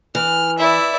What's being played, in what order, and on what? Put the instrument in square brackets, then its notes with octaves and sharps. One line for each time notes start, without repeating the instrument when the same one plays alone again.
[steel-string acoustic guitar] E3 [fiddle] F6
[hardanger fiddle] E4 D5 [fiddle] E5